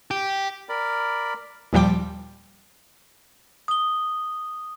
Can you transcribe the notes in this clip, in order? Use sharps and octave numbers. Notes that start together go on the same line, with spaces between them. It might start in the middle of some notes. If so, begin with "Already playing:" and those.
G4
A#4 D5 B5
D#2 A#2 F3 G3 G5 D6
D#6 G7